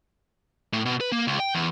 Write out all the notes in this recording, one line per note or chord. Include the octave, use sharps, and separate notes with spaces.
A2
B2
B4
A#3
C#2
G5
E2